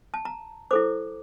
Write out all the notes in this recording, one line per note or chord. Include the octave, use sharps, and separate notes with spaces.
A5
A#5
E4 A4 C5 D6